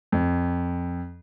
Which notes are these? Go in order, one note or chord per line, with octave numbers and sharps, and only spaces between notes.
F2